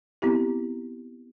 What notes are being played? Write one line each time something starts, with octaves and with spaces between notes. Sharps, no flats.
B3 C4 E4 G4